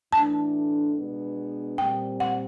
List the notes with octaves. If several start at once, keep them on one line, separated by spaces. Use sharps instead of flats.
A2 E3 A3 D4 A5
B2 G#3 B3 D4
A#2 G3 C4 G5
F#5